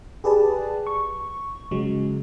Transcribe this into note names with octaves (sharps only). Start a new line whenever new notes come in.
G4 G#4 B4 D5 A5
C#6
C#3 F#3 G#3